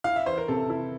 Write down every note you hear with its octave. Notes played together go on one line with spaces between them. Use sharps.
E4 F5
E5
E3 C5
A#4
C3 A4
E4